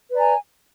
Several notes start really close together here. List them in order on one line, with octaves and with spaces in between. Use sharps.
B4 D5 A#5 G#5